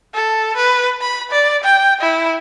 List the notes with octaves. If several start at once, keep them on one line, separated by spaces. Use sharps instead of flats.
A4
B4
B5
D5
G5
E4